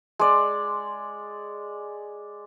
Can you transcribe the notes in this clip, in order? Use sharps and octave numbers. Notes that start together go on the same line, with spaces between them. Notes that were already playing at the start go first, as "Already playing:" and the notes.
G#3 D5